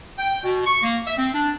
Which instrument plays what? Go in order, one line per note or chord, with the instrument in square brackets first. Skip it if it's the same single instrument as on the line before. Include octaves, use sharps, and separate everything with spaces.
[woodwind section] G5
B2
C#6
A#3
E5
C4
D4